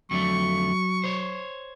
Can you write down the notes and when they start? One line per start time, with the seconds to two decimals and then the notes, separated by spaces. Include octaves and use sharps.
0.11 F2 D3 F#3 A3 C#6
1.04 C5 C#5